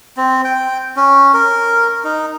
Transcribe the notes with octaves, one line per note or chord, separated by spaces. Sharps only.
C4
G5
C#4
A#4
D#4